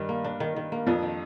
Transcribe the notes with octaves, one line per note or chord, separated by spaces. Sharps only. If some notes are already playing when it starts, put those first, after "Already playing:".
Already playing: G2 D#3 G3
A#3
D4
D#3
D#3
A#3
F2 F3 D4
D#3